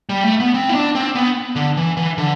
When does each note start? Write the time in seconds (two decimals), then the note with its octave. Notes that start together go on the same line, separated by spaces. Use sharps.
0.09 G3
0.24 A3
0.40 B3
0.54 C4
0.69 E4
0.75 D4
0.95 C4
1.15 B3
1.56 D3
1.77 E3
1.97 E3
2.18 D3